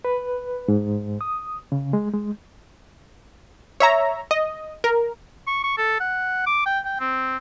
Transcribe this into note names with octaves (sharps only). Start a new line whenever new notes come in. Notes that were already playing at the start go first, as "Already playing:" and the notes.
B4
G#2
D#6
C#3
G#3
G#3
C#5 E5 A#5
D#5
A#4
C#6
C#6
A4
F#5
D6
G5
G5
C4